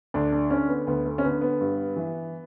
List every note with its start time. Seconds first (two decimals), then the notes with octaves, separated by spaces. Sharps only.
0.14 D2 D4
0.33 D4
0.50 D3 C#4
0.69 B3
0.87 D2 B3
1.05 A3
1.18 C#4
1.23 D3 B3
1.41 B3
1.60 G2
1.96 E3